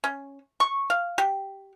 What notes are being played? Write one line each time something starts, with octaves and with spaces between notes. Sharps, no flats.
C#4
C#6
F5
G4